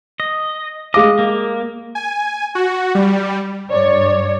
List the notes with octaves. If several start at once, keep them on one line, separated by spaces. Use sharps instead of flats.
D#5
G#3 D#5 F5 D6
A#3
G#5
F#4
G3
G2 C#5 D5